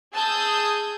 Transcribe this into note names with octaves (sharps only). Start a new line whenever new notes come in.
G#4 G#5 A5 D#6 E6 G6